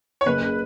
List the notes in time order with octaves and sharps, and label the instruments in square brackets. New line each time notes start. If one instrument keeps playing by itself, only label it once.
[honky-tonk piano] C#5
[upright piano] F#1 [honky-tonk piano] B4
[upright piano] C#3